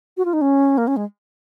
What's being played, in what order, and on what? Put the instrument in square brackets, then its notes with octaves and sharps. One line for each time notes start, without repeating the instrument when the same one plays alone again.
[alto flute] F#4
F4
D#4
C#4
A#3
C#4
G#3